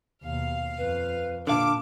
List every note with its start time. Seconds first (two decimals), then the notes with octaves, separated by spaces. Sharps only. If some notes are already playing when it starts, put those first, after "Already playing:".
0.23 D#2 B2 F5
0.77 F2 B4
1.47 A#2 D3 F5 A5 D6